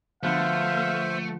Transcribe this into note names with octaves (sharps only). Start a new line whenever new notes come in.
D3 F3 A3 B3 C5 E5 F5